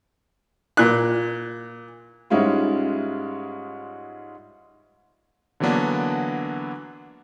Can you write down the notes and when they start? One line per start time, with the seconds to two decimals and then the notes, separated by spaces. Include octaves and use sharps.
0.77 A#2 F#6
2.30 G#2 G3 G#3 C#4 E4 F4
5.60 D3 E3 F#3 A#3 B3 D4